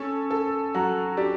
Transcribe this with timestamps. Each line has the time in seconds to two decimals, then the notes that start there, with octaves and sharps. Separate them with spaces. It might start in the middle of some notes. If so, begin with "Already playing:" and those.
Already playing: C#4 A4
0.31 A4
0.74 F#3 F#4
1.17 D4 G4